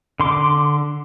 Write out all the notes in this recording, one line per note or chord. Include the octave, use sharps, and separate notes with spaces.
D3 C6 D6